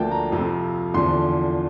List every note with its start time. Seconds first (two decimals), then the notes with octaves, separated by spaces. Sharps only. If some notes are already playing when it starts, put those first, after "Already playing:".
Already playing: D2 D3 F3 A#3 G5 A5
0.11 A#5
0.31 F2 C3 F3 C4
0.94 E2 D3 F3 C6